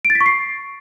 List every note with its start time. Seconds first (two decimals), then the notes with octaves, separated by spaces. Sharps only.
0.05 D7
0.10 A6
0.15 B6
0.21 C#6
0.26 C7